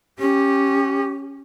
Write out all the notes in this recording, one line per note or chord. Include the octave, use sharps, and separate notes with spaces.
C#4 G4